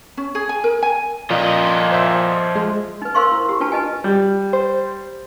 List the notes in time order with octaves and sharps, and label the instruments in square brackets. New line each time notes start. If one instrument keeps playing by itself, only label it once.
[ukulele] C#4
G#4
G#5
A#4
G#5
[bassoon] A#2 [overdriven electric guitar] F3 D#5
[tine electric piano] C5 E5
G#3
[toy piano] D#4 B4
A#4 C5 F5 C6 C#6
E4
G4
D4 F4 B4 A5
B4 D#5 G#5
[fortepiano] G3
[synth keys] C5